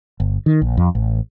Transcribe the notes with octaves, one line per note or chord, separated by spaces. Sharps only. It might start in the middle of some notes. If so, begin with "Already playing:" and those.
G1
D#3
A#1
F2
A1